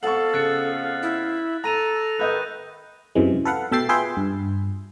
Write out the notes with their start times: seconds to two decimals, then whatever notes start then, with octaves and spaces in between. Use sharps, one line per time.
0.03 F2 B3 A4 F5 F#5 C#6 F#7
0.34 C#3 F#6 A6 C#7
1.03 E4
1.64 A4 A#5 A#6 D#7 F7
2.19 D#3 D#4 B4 D#5 F#6 G6
3.15 F#2 C3 E3 G#3
3.45 A4 B4 F5 F#5
3.71 B2 A3 E5 G5 A6 C7
3.89 F4 G#4 B4 E5 G5 C6
4.17 G2